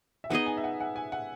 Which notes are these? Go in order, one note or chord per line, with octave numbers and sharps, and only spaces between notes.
E5
B3 D#4 G#4 D#5 F#5
G#5
E5
F#5
F#5
G#5
F#5